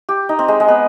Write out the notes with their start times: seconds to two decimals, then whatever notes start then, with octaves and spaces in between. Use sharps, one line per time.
0.09 G4
0.29 D#4
0.39 C4
0.48 G#3
0.60 G#3
0.68 B3